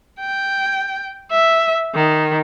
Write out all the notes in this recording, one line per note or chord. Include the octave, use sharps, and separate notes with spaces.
G5
E5
D#3